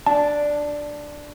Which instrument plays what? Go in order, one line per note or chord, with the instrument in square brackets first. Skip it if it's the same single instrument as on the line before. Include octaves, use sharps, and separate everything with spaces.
[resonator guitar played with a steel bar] D4 [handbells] A5